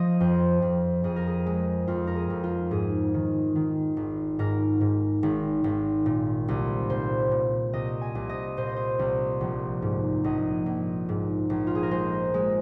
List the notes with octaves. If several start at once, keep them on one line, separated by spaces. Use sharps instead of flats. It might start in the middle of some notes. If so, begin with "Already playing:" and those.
Already playing: F3 D#5
F2 C5
F2
F2 G#4
A#4
G#4
G#3
F2 F4
A#4
G#4
F2
F4
G#2 G#4
D#3
D#3
G#1
G#2 A#4
G#2
G#1
G#1
A#2
C2
A#2 C5
A#2
C2 D#5
G#5
C2
D#5
A#2 C5
D#5
C5
C2
A#1
G#2
A#1 D#5
A#1
G#2
A#1
F4
G#4
A#4
G#3 C5
G#3